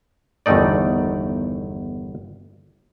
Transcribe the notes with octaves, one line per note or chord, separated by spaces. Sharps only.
G1 E2 D#3 A3 D#4 D5